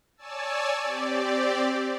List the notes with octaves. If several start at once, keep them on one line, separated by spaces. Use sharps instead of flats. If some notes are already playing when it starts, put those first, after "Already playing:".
C#5 D5 G#5 A5 E6
C4 G4 D5